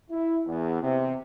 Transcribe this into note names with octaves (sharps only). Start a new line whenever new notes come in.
E4
E2
C3